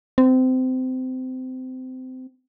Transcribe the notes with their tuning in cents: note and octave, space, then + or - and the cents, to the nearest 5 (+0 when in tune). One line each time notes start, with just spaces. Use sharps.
C4 -25